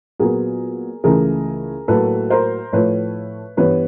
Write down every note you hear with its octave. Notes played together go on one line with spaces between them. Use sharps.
A#2 F#3 B3 G#4 A#4
C#2 C#3 E3 A3 G#4 A#4
A2 F#3 A#3 A4 B4
A#4 C5
A2 F3 A3 B4 C#5
G2 E3 G3 B3 B4 C#5